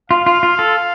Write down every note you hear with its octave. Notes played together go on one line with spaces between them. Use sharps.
F4 F5
F4
F4
A4